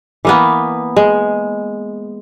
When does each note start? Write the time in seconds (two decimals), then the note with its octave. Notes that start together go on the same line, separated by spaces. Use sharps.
0.25 E3 A#3 B3
0.96 G#3